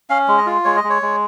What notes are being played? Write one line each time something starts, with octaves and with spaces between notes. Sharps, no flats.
C#4 F5
G#3
D#5
F4
G#3 C#5
D#5
G#3
C#5
G#3